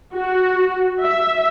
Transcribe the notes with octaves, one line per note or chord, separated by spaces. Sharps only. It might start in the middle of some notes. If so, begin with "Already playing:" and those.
F#4
E5